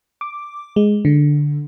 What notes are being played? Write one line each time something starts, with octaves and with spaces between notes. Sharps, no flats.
D6
G#3
D3